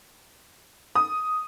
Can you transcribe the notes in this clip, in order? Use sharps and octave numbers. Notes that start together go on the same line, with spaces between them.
D#6